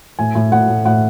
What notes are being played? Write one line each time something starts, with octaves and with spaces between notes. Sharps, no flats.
A2 G#5
A2
A2 F#5
A2
A2 F#5